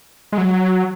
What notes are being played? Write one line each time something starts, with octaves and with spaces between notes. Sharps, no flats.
G#3
F#3